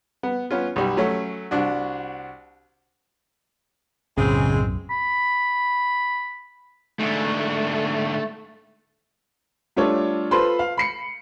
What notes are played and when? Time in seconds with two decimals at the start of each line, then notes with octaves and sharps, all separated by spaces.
0.23 B3
0.51 B3 C#4 F4
0.76 B1 G3
0.97 F#3 A3 C#4
1.51 C2 D4 F#4
4.18 B1 F#2 A2 C#3 G#3 C4
4.90 B5
6.99 G#2 D3 A3
9.76 G3 A3 D4 F4 A4 C#5
10.31 F4 A4 B4 C5 B5 C6
10.59 F5
10.77 B5 C7 C#7